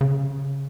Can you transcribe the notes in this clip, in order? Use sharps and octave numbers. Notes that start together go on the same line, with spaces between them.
C#3